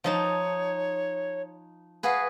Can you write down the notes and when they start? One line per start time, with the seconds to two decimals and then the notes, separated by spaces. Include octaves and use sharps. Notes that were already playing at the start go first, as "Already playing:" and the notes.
0.04 F3 D#4 C#5 A5
2.03 F#4 G#4 B4 F5